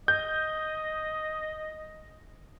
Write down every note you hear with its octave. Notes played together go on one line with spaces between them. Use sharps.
D#5 G6